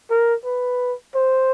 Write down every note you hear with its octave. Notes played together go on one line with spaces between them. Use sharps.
A#4
B4
C5